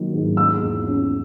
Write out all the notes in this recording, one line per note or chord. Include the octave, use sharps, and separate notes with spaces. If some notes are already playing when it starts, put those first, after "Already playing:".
Already playing: D#3 F#3 A#3
G#2
G#3 E6
E2
C#4